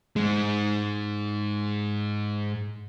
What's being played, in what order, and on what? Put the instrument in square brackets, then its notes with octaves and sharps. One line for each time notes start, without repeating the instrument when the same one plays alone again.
[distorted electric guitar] G#2 G#3